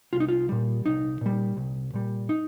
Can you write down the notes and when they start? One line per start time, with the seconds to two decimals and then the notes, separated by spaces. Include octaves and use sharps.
0.13 C2 F4
0.20 D#4
0.28 F4
0.49 A#2 G3
0.85 C2 D#4
1.21 A#2 G3
1.57 C2
1.94 A#2 G3
2.29 D#4